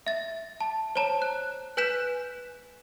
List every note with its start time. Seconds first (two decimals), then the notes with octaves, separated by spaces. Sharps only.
0.07 E5 A6
0.61 A5
0.96 C5 C#5 A5 A#5
1.22 F#6
1.77 B4 G#5 F#6 G6 B6 E7